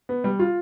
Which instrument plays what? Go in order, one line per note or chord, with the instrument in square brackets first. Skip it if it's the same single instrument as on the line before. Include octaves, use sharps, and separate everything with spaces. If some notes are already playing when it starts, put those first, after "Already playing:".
[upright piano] B3
G3
F4